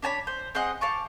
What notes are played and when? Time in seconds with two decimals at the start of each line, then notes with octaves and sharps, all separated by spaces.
0.02 D4 C#5 A5 B5
0.27 C5
0.55 C4 G#4 D#5 F#5
0.81 F5 A5 C#6 D6